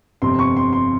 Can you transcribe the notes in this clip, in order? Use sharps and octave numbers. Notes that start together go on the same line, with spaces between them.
G1 F2 C3 C6
C#6
C6
C6